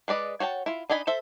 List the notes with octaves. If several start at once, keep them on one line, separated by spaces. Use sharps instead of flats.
G#3 B4 D5 D#5
F#4 C#5 G5 A5
E4 F4
D4 D#4 D#5 G#5 B5
A4 C5 E5